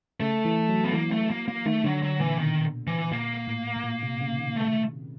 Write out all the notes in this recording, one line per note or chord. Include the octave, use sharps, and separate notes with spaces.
C#3 A3
E3
F#3
B3
E3 A#3
A3
A#3
A#3
D#3 A3
D3 F#3
F#3
A#2 E3
B2 D#3
E3
A#2 A#3
A2
A2
A#2
C3
C#3
D#3
A3